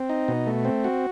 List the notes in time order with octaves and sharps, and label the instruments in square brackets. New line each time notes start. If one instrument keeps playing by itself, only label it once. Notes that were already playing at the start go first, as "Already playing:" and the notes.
Already playing: [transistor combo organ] C4
D#4
B2
A3
C4
F#4